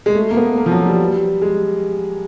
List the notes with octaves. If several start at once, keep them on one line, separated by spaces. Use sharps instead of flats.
G#3
A3
A#3
B3
A#3
F3
F#3
G3
G#3